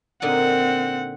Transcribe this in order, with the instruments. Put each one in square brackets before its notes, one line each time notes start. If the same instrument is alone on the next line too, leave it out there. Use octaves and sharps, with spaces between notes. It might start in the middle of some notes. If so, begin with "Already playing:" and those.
[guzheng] A#2 D3 D#4 [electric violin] C4 F#5